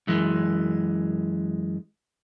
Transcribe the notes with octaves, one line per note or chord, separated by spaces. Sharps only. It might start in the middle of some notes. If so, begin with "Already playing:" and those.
F#2 E3 G#3